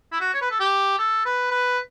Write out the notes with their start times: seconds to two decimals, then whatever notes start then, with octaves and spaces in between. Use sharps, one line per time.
0.12 E4
0.21 F#4
0.34 C#5
0.42 B4
0.51 A4
0.60 G4
0.99 A4
1.26 B4
1.51 B4